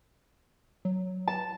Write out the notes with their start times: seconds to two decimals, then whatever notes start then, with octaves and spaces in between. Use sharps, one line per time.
0.85 F#3
1.27 A5